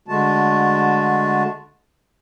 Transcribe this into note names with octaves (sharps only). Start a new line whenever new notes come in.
D3 G#3 A3 F#4 A5